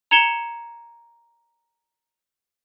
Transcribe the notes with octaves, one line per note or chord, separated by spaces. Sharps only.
A#5 G#6 C#7 E7 G7